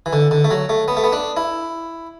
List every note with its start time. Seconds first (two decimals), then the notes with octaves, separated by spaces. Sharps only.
0.06 E3
0.13 D3
0.31 D3
0.44 A3
0.51 F#3
0.69 A3
0.88 B3
0.97 A3
1.04 B3
1.13 D4
1.37 E4